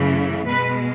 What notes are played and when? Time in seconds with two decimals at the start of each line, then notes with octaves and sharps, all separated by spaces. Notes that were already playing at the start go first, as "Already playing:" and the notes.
Already playing: F#2 C#3 E3 A3
0.46 B2 G#3 B4